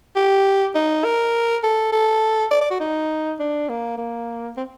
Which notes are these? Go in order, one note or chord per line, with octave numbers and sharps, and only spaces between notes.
G4
D#4
A#4
A4
A4
D5
D5
F#4
D#4
D4
A#3
A#3
C4